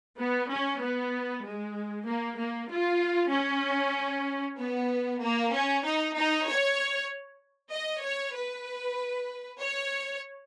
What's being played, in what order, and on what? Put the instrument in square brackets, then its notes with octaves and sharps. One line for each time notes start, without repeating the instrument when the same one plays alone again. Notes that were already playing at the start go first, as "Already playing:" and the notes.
[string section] B3
C#4
B3
G#3
A#3
A#3
F4
C#4
B3
A#3
C#4
D#4
D#4
C#5
D#5
C#5
B4
C#5